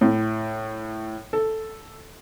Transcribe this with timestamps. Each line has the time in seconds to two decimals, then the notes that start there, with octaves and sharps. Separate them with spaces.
0.01 A2
1.33 A4